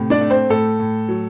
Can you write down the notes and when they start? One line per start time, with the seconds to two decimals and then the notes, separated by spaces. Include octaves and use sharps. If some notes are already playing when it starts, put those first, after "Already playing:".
Already playing: A2 C3
0.10 D4 D5
0.21 A3
0.30 C4 C5
0.50 A2 A4
0.79 A2
1.09 F#3